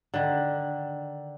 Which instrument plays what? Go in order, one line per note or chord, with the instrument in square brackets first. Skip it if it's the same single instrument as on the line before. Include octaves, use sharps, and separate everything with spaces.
[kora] D3 D#3